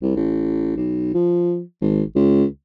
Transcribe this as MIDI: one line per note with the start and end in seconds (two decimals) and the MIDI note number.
0.02 0.15 36
0.16 0.75 33
0.77 1.14 35
1.14 1.61 53
1.81 2.02 32
2.16 2.45 37